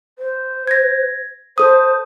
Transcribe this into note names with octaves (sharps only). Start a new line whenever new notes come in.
C5
G#6 A#6
A4 C5 D#6